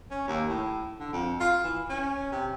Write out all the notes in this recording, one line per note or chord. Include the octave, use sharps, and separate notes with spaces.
C#4
D#2
A2
D3
F2
F4
E3
C#4
C3